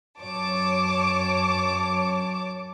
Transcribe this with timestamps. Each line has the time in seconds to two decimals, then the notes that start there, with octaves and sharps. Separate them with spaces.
0.20 F#2 C#5 A5 D6